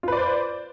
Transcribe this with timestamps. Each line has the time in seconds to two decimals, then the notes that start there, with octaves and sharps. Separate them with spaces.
0.03 F4
0.08 B4
0.12 D5
0.17 C5